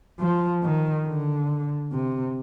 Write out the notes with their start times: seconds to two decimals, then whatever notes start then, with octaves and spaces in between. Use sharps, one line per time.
0.20 F3
0.63 D#3
1.06 D3
1.92 C3